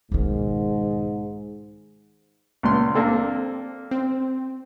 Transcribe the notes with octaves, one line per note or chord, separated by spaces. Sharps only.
B1 G#2 D#3
C#2 A#2 C6
A#3 C4 D4 A4
C4